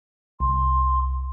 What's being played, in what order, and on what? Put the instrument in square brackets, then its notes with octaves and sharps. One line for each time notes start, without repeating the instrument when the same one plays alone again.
[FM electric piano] C2 [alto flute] C6